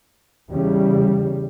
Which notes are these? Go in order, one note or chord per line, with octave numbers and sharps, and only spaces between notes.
E2 C#3 G3